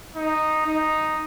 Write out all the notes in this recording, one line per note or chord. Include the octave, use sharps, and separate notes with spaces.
D#4
D#4